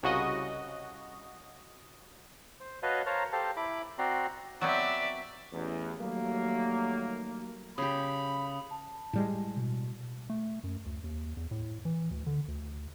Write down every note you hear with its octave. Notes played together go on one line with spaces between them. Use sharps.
C2 C#3 F#4 D#5
C5
F#4 B4 C#5 D#5 F5 A5
A#4 C5 C#5 F5 A5 A#5
G4 A4 C5 F5 A5
E4 B5 D6
C4 F#4 D5 A#5 C6
F#3 B3 C4 D5 E5
A1 E2
D#2 F#3 G3 A3 A#3
C#3 G4 B5 D#6
A5
A2 G3 G#3
B2
A3
F#2
D2
D#2
E2
A2
E3
D2
D3
D2